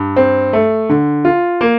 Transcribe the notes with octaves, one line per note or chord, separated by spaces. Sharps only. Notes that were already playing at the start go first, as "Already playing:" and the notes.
Already playing: G2
C4
A3
D3
F4
A#3